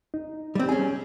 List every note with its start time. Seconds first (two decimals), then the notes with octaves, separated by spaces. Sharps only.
0.14 D#4
0.55 G3 C4
0.69 C#4 G#4 G#5